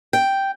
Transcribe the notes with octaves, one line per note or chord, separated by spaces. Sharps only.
G5